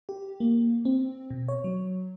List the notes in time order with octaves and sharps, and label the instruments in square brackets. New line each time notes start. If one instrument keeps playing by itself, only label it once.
[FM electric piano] G4
A#3
C4
B2
C#5
F#3